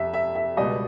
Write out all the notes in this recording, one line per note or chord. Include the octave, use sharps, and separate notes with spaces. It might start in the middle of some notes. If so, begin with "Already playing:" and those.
Already playing: F2 C3 E5
E5
E5
C#2 B2 G3 D#5